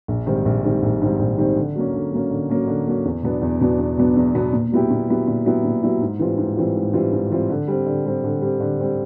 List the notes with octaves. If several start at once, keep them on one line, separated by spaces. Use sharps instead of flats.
A#1
G#2 D#3 G3 C4
A#1
G#2 D#3 G3 C4
A#1
G#2 D#3 G3 C4
A#1
G#2 D#3 G3 C4
D3
F#3 A#3 C#4
D3
F#3 A#3 C#4
D3
F#3 A#3 C#4
D3
F#3 A#3 C#4
E2
B2 F#3 B3 D4
E2
B2 F#3 B3 D4
E2
B2 F#3 B3 D4
E2
B2 F#3 B3 D4
A#2
F#3 B3 E4 G4
A#2
F#3 B3 E4 G4
A#2
F#3 B3 E4 G4
A#2
F#3 B3 E4 G4
G#2
E3 G3 C4 F4
G#2
E3 G3 C4 F4
G#2
E3 G3 C4 F4
G#2
E3 G3 C4 F4
D3
G3 C4
D3
G3 C4
D3
G3 C4
D3
G3 C4